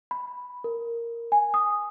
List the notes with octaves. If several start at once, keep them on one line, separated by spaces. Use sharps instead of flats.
B5
A#4
G#5
D#6